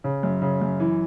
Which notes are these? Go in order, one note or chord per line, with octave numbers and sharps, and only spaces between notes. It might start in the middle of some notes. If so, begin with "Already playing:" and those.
C#3
F#2
C#3
F#2
E3